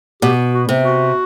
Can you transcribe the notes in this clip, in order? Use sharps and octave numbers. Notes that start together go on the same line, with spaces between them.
B2 G4
F#4
C3
F#4